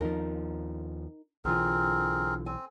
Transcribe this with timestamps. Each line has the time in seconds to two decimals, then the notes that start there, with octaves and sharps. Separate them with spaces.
0.01 D#2 F3 D#4 A#4
1.45 B1 D3 E3 C4 F4 G#4 A#4
2.46 C4 G#5